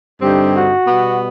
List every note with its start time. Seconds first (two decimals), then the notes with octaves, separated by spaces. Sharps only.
0.22 G2 D3 G3 C4 D#4 G4
0.54 F#4
0.85 B2 G3 B3